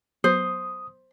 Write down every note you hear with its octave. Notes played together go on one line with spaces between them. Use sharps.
F#3 B3 C5 D#6